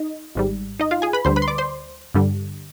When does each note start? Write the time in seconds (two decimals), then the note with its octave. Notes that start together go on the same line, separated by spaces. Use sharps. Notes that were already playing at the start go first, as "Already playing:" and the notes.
Already playing: D#4 D#5
0.35 G#1 G#2 G3
0.80 D#4 D#5
0.91 F4 F5
1.02 G#4 G#5
1.13 B4 B5
1.25 D2 D3 G3 C5 C6
1.36 B4 B5
1.42 C6
1.48 D5 D6
1.58 C5 C6
2.15 G2 D3 G3